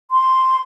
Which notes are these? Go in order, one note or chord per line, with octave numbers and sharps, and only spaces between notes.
C6